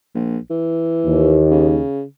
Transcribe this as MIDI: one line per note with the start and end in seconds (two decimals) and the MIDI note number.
0.15 0.37 34
0.50 1.44 52
1.06 1.81 39
1.51 2.03 49